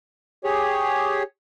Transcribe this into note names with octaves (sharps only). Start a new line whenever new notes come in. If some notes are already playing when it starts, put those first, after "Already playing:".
G4 G#4 C#5